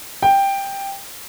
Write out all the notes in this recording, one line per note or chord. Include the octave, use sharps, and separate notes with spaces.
G5